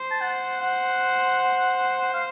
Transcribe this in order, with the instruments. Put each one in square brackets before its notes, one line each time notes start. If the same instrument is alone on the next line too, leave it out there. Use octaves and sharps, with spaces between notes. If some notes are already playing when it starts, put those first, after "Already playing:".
Already playing: [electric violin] C5
[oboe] A5
F#5
F#5
F5